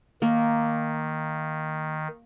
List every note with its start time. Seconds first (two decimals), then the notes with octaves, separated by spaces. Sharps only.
0.22 D#3 A#3